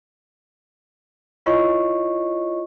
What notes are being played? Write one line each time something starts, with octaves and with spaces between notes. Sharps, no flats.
E4 F4 C#5 D#5 C#6